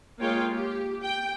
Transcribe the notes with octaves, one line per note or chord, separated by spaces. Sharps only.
G#3 A#3 F4 C#5 F5 G5
G4
G5